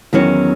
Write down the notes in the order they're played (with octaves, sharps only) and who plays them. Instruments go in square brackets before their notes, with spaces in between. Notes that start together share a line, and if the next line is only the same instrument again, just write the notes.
[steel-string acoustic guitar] E2 D#3 F#3 C#4